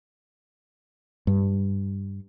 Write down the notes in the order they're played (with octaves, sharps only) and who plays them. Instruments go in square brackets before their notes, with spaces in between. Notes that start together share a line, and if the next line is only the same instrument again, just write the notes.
[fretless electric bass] G2